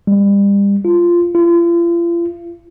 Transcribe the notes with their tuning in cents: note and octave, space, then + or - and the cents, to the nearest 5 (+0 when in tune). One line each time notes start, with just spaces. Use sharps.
G3 +35
F4 -10
F4 -40